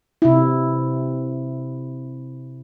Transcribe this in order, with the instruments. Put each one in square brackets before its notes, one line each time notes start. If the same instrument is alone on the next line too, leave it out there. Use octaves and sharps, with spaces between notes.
[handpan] C3 E4